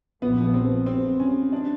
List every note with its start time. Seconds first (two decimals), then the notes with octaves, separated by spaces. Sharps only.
0.22 A#1 A#2 F3 B3
0.44 B3
0.54 C4
0.86 C4
1.20 C#4
1.52 D4